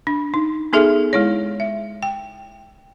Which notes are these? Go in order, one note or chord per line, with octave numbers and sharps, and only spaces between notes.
D4
D#4
B3 D#4 G#4 A4 E5
G#3 E4 C#5
E5
G5